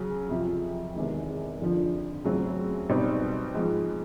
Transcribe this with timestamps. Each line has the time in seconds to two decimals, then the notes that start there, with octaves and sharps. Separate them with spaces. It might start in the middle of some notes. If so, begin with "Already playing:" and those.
Already playing: C#3 F#3
0.30 F2 C3 F3
0.94 E2 C3 D#3 G#3
1.59 F2 D3 F3
2.24 C#3 F#3 A3 C4
2.89 B2 G3 C4 D#4
3.55 G#2 F3 G#3